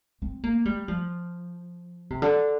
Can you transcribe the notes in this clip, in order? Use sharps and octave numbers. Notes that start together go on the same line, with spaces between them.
C4
A#3
G3
F3
C3
D3